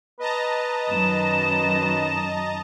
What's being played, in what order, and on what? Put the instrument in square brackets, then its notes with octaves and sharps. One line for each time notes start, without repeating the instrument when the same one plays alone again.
[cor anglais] B4 [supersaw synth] D#5 A5 A#5
[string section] F#2 D#3 [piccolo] E7